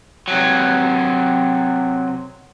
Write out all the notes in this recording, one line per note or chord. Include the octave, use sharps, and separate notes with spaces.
C3 F#3